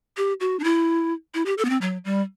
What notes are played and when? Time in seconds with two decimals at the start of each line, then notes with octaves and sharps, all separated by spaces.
0.17 G4
0.40 F#4
0.60 D4
0.64 E4
1.34 E4
1.46 G4
1.58 A4
1.65 B3
1.69 C4
1.81 F#3
2.05 G3